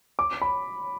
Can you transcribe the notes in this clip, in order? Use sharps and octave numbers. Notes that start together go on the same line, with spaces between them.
D6
B5